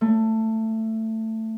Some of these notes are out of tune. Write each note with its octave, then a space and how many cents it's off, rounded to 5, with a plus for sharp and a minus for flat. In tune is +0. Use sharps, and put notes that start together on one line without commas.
A3 +15